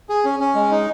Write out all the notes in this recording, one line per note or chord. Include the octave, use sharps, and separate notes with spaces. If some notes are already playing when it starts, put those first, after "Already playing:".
G#4
C#4
C#4
G#3
D#4